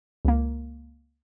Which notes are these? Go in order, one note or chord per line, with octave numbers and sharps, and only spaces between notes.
C#2 A#3